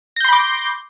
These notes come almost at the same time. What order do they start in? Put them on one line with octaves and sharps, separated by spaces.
A#6 G6 C6 B5 D6